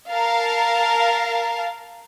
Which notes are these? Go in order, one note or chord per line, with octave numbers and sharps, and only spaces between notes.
A#4 F5 A5